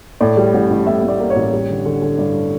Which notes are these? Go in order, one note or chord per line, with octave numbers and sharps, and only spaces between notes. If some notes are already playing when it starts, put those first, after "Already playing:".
A2 D5
G3
A1
A1
A2 E5
A2
D5
A#3
C#5
A1
G3
D3
D3
D3
G2 D5